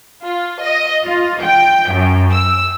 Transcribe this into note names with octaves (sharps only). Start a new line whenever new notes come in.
F4
D#5
F4
G5
F#2
E6